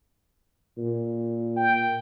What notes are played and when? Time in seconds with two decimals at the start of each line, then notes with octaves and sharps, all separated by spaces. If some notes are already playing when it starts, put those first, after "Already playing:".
0.78 A#2
1.57 G5